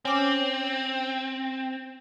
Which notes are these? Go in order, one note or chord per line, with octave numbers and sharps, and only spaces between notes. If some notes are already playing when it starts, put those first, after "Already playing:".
C4 C#4 D6